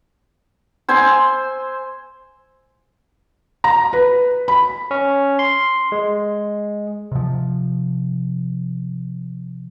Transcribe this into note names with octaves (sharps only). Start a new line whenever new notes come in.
C5 G#5 C6 E6
A#5
B4
B5
C#4
C6
G#3
C3 F3